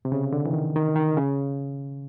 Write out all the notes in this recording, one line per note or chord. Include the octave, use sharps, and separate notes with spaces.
C3
C#3
D3
E3
D#3
D#3
D#3
C#3